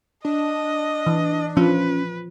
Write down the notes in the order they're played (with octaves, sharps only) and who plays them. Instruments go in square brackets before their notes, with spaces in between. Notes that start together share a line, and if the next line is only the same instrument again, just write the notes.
[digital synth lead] D4 [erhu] D#5
[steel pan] E3
[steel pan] F3 [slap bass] C#4 [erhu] B4